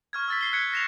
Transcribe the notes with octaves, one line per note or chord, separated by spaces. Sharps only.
C#6 F6 G#6
E6 A6 B6
C7 G7
F#6 G#6 B6 C#7
A#6 E7 F7